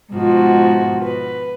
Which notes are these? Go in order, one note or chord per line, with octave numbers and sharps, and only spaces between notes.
G#2 B2 F3 F#4
B4